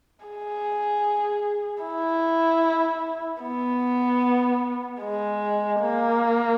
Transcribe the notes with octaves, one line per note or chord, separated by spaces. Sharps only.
G#4
E4
B3
G#3
A#3